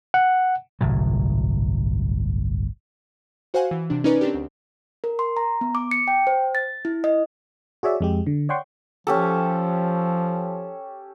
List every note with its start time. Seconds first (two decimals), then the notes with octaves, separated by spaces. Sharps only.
0.14 F#5
0.81 G1 C2 A2 F#3
3.54 F#4 C5 F5 F#5 G#5
3.71 E3
3.90 C3 D4
4.04 C#4 D#4 A#4 B4 D5 A#5
4.21 C4 D4 G4
4.34 D2
5.04 A#4
5.19 C6
5.37 A#5
5.61 B3
5.75 D6
5.91 C#7
6.08 G5
6.27 C5
6.55 A6
6.85 E4
7.04 D#5
7.83 F#4 G#4 C#5 D5 E5
8.00 F2 G#3 G4
8.27 D3
8.49 C#5 D5 F#5 G5 C6 C#6
9.07 F3 C#4 G4 A4